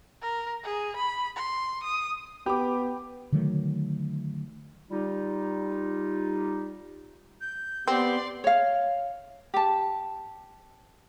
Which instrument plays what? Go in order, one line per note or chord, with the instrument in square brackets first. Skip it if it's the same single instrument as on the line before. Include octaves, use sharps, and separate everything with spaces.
[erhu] A#4
G#4
B5
C6
D#6
[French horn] B3 [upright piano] G4 D6 [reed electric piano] G5 B5
[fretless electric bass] D3 D#3 F#3 A3
[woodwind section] G3 D#4 F4 G4
[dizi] G6
[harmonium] B3 G4 [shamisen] C4 [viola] D5 C6
[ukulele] C#5 F5
G4 A5